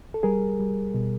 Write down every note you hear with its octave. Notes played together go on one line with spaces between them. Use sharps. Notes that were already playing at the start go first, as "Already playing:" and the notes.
A4
G3 G#4 A#4
G3
B2